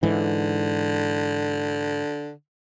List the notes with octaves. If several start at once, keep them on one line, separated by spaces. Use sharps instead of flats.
G#2 D3 E3